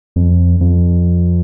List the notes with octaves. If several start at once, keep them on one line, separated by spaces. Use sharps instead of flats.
F2
F2